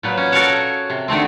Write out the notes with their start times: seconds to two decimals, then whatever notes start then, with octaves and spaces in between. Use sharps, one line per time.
0.03 A#2 F#3 B4
0.17 C#4
0.32 F#4 A4 A#4 C#5 F5 F#5
0.90 C3
1.08 D3 D#3 A3 C4